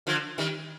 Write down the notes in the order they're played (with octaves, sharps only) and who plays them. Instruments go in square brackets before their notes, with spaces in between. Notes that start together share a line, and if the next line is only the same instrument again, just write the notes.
[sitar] D3 F3
D#3 G3